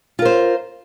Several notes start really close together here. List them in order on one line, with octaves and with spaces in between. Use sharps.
F4 A#4 C5